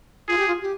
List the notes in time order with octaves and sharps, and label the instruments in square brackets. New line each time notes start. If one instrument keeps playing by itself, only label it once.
[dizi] F4 [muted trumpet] G#4
[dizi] G4
F4
G4